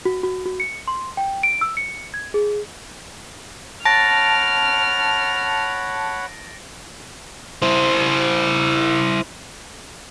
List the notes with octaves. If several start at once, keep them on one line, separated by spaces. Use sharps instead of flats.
F#4
F#4
F#4
C#7
C6
G5
D7
E6
C#7
G#6
G#4
C#5 F#5 A5 B5 F6 A6 A#6 D7
E4 C5